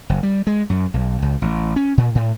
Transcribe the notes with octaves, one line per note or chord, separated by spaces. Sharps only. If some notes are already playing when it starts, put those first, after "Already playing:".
F#1
G3
G#3
F#2
B1
C#2
A1
C#4
A#2
A2